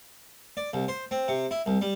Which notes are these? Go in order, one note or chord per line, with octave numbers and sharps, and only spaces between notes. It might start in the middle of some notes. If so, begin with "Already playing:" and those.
D5
C2
C5
C4
C3
E4
C2
G3